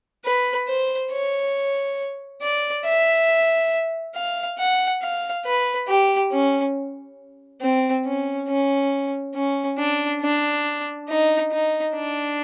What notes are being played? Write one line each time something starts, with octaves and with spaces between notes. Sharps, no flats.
B4
C5
C#5
D5
E5
F5
F#5
F5
B4
G4
C#4
C4
C#4
C#4
C#4
D4
D4
D#4
D#4
D4